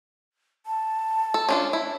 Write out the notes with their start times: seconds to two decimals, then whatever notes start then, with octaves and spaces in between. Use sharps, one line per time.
0.66 A5
1.34 A4
1.49 C#4 D4 F4
1.73 E4